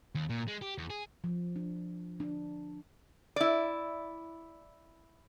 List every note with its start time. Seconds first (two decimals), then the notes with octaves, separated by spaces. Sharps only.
0.15 D#2
0.29 A#2
0.48 G#3
0.61 G4
0.78 E2
0.90 G#4
1.24 F3
1.56 D4
2.20 D4
3.36 E4 D5